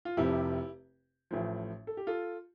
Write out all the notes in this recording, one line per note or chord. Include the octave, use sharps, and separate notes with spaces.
F4
F1 F2 C3 E4 G4
A1 A2 F3
A4
G4
F4 A4